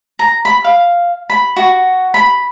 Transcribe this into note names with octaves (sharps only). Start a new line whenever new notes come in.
A#5
B5
F5
B5
F#4
B5